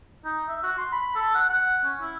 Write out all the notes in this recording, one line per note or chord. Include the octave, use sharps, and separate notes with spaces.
D#4
E5
F#4
C6
B5
A4
F#5
F#5
C#4
E4